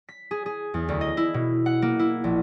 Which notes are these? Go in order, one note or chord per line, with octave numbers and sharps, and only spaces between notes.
B6
G#4
G#4
E2
D2
D#5
E4
B2
F#5
A#3
E4
A#1